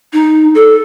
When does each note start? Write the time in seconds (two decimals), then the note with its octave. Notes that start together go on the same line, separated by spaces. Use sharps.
0.13 D#4
0.55 A4